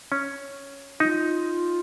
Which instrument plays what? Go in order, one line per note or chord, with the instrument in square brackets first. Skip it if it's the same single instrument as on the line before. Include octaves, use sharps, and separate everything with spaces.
[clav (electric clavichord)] C#4
[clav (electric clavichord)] D#4 [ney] F4